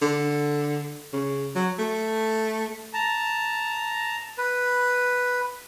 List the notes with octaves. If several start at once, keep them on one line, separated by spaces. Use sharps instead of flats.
D3
C#3
F#3
A3
A5 A#5
B4